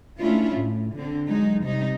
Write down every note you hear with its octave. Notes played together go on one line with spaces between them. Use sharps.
A3 C#4 D4 E4 F4
A2
D3 C4
F#3 G#3 D#4
C3 G3 D#4